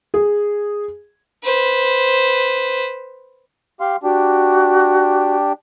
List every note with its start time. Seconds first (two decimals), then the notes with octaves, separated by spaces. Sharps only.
0.14 G#4
1.44 B4 C5
3.80 G4 F5 C6
4.03 D4 F#4 G4